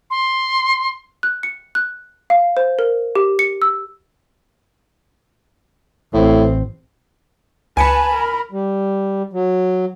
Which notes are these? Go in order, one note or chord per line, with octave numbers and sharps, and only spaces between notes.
C6
F#6
C#7
F#6
F5
C5
A#4
G4
C#7
E6
A1 A2 C4
C#2 B4 G#5 A5 B5 C#7
A#4
G3
F#3